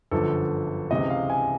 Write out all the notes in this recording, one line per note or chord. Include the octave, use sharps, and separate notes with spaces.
G1 F#2 D3 F3 A4
C#2 C3 E3 D#5
F5
G#5